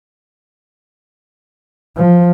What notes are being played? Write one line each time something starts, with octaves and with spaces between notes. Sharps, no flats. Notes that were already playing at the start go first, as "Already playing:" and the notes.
F3